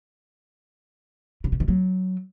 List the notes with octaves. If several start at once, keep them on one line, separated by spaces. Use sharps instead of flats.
C#3
C3
D#3
F#3